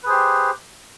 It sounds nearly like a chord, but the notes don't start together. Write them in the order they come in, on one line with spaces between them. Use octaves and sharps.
B4 G#4 C5 G4